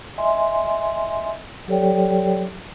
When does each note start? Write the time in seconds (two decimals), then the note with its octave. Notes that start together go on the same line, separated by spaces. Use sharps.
0.18 D#5 E5 G#5 C6
1.68 F#3 G4 A4 C#5 D5 G5